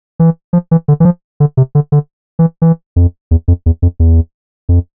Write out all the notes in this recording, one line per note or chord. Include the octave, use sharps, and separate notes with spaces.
E3
F3
E3
D3
E3
F3
D3
C3
D3
D3
E3
E3
F2
E2
F2
E2
F2
E2
F2